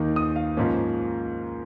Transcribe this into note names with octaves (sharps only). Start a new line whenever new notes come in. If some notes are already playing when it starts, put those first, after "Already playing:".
Already playing: D#2 D#3 A#3 D#4
D#6
F5
G#2 F3 A#3 C#4